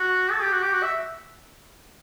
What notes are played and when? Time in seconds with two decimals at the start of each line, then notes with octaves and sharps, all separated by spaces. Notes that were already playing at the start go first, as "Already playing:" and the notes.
Already playing: F#4
0.31 A4
0.42 G4
0.52 F#4
0.62 G4
0.73 F#4
0.83 E5